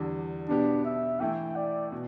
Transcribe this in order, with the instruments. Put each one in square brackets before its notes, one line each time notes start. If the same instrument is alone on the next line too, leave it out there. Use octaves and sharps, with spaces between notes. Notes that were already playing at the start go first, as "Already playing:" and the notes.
Already playing: [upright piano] E2 D3 G3 D4
[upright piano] B2 B3 G4 [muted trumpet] D4
[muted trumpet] E5
[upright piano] E3 A3 E4 [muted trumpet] G5
[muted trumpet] D5
[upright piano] B2